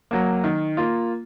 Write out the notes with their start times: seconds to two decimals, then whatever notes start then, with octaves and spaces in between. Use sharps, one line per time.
0.11 F#3 A#3
0.44 D#3
0.77 A#3 F4